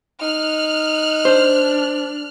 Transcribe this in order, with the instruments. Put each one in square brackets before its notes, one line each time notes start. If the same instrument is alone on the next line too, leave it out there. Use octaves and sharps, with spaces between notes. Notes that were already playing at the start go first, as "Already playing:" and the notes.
[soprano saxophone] D#4 [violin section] F6 F#6
[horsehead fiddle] D4 [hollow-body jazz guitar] C5